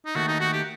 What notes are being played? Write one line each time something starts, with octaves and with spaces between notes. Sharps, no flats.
D#4
D#2 D#3 A3 F#4
D#4
F#4
G4